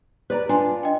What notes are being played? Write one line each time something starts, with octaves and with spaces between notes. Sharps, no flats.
B4 D5 A#5
D4 F4 G#5
D#5 G5